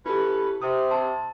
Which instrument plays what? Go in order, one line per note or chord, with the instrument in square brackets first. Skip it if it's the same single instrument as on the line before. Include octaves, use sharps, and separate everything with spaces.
[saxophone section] C#4 A4 B4 [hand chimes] E4 G4
[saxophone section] C3 [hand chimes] D#6
[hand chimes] A5 C6